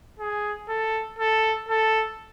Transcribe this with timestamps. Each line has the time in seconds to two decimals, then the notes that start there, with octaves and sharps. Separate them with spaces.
0.19 G#4
0.69 A4
1.19 A4
1.69 A4